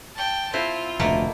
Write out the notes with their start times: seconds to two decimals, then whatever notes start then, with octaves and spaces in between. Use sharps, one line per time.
0.15 G5 A5
0.53 C4 E4 F4 C5
1.00 F1 D2 B2 A3 A#3 A#4